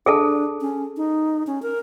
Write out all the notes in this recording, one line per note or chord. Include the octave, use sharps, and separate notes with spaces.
D4 G#4 A4 A5
C#4
D#4
C#4
A#4